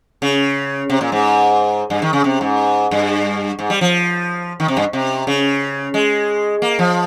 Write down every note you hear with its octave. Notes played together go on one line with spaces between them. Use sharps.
C#3
C3
A#2
G#2
G2
D#3
C#3
C3
G#2
G2
G#2
G3
F3
D#3
C3
G2
C3
C#3
G#3
A#3
F3